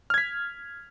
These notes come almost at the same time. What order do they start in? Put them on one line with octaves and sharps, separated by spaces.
F6 G#6 B6